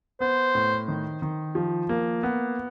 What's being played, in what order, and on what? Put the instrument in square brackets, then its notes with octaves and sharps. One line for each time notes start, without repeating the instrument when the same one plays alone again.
[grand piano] B3 [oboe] C5
[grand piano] A2
D#3
D#3
F3
A#3
B3